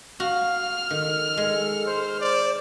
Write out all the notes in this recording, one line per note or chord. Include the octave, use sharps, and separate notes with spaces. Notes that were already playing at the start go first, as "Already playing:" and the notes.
F#4 F5 F6
D#3 A4
G#3 A4
C5
C5 D5